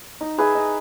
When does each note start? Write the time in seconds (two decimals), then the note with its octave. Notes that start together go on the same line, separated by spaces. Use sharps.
0.21 D#4
0.38 G#4 B4 E5
0.55 D#4